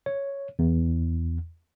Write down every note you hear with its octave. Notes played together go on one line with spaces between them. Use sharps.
C#5
E2